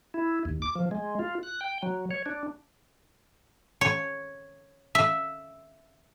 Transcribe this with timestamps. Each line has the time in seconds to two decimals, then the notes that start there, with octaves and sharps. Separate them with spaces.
0.14 E4
0.45 D#2
0.62 D6
0.75 F3
0.91 G#3
1.19 F4
1.43 F#6
1.61 G5
1.83 F#3
2.11 C#5
2.26 D4
3.81 C#5
4.95 E5